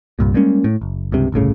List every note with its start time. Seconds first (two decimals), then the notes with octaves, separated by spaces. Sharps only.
0.19 C2 G2 A#2
0.34 G3 G#3 A#3 C#4
0.64 A2
0.82 F#1
1.12 C#2 G2 C3
1.32 G1 C2 A2 C#3